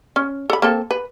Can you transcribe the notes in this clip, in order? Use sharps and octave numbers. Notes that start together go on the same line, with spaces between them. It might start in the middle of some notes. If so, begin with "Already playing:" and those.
C#4
A4 B5
A#3 C4 A4
B4